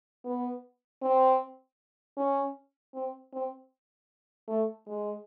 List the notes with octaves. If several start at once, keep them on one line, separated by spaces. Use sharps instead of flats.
B3
C4
C#4
C4
C4
A3
G#3